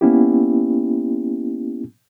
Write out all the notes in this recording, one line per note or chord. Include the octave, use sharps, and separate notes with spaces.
A#3 B3 C#4 E4 G4